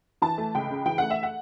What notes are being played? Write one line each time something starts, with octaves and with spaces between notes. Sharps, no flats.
E3 A5
A3
C#2 G5
C#3
E3 G5
A3 F#5
E5
F#5